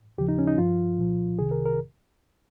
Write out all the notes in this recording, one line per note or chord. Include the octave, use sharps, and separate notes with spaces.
D#2 C#3 F3 G4
D#4
C#4
D#4
G2 F3 F4
C2 A#2 F3
C2 C3 D#3 G#4
A#4
A#4